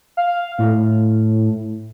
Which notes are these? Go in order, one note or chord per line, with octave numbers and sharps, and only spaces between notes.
F5
A2